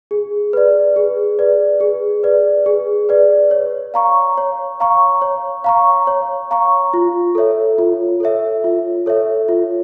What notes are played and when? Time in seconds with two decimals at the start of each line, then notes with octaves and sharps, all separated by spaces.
0.11 G#4
0.53 B4 D5
0.96 G#4
1.39 B4 D5
1.80 G#4
2.23 B4 D5
2.66 G#4
3.09 B4 D5
3.51 C#5
3.94 F5 A#5 C#6
4.38 C#5
4.80 F5 A#5 C#6
5.22 C#5
5.64 F5 A#5 C#6
6.07 C#5
6.51 F5 A#5 C#6
6.94 F4
7.35 A4 C#5 E5
7.78 F4
8.20 A4 C#5 E5
8.64 F4
9.06 A4 C#5 E5
9.48 F4